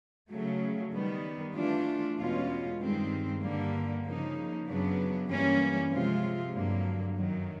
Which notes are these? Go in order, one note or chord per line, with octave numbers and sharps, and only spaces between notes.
C#3 F#3 A3
D#3 G3 B3
E3 A3 D4 F4
E2 B2 G#3 C#4 F4
G2 D#3 G#3 C4
G2 D3 G3 A#3
C#3 F3 A#3 D#4
F#2 C#3 F#3 B3 D4
G2 E3 G3 A#3 C#4
C3 F3 G#3 C4 F4
G2 D3 F#3 A#3
F#2 D#3 F#3